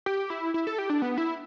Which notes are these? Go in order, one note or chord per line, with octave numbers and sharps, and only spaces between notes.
G4
E4
E4
A4
G4
D4
B3
E4